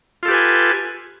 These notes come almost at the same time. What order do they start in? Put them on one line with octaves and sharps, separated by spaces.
F4 A4 G4 B4 G#5